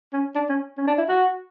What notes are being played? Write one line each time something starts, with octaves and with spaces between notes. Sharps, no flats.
C#4
D4
C#4
C#4
D4
E4
F#4